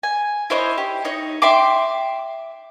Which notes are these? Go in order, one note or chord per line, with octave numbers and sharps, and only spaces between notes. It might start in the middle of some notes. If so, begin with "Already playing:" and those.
G#5
E4 C5 C#5 D#5
G4
D#4 C#5 D#5
E5 G5 C6 D6